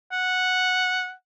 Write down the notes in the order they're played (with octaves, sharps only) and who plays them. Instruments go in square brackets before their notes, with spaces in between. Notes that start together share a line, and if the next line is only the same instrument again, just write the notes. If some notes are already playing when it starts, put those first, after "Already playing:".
[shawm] F#5